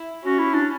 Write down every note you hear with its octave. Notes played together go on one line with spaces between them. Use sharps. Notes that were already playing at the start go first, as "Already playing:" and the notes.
Already playing: E4
C#4 F#4
E4
D4